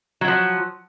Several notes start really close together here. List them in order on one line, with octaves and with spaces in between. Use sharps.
F#3 F#4 F3